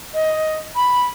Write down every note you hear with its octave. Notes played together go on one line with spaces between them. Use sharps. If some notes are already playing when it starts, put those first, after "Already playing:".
D#5
B5